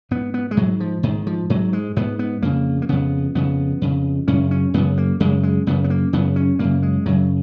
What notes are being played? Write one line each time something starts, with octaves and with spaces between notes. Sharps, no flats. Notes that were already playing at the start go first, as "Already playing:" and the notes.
G#2 B3
B3
G#3
G#2 F#3
F3
G#2 D#3
F3
G#2 F#3
G#3
G#2 B3
B3
F2 C#3 A#3
A#3
F2 C#3 B3
F2 C#3 B3
F2 C#3
F#2 C#3 C#4
C#4
F#2 C#3 B3
A#3
F#2 C#3 G#3
G#3
F#2 C#3 B3
B3
A#3
F#2 C#3 B3
C#4
F#2 C#3 A#3
G#3
F#2 C#3 F#3